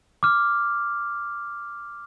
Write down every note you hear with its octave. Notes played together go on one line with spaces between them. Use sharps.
D6 F6